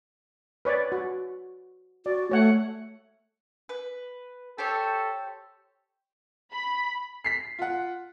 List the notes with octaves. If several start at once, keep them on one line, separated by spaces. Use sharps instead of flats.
B4 C#5 D5
F#4
F#4 D5
A3 C#5 F#5
B4
G4 A4 C5 C#5
B5
B6 C7
F4 F#5